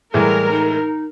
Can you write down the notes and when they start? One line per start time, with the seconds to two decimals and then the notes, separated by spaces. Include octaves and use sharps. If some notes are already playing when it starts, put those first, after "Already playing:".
0.14 A2 E3 G3 G#3 A#4
0.51 D#4